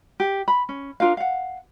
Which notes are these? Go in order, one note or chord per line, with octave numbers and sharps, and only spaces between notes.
G4
B5
C#4
D4 F4 A#4 F5
F5 F#5